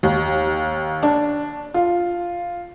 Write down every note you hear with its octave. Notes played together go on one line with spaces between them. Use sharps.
D#2
D4
F4